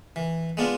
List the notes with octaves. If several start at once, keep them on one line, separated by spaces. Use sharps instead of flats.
E3
G#3 B3 D4 F4